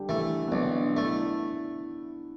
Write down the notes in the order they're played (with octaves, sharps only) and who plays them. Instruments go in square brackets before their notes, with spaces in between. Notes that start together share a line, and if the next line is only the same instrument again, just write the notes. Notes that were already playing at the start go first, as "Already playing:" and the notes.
Already playing: [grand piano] D3 G3 D4 G4
[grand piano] E3 E4 [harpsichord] A3
[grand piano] B3
[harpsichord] B1 [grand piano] D3 D4
[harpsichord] A3 [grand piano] D4
[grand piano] E4